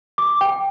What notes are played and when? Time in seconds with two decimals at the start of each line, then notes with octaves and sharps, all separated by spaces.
0.18 D6
0.41 G5